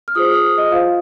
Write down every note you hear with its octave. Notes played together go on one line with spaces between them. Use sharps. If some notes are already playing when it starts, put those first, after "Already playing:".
F6
F4 G#4 C5 D#6
F6
D#6
D#5
F4 C5 F5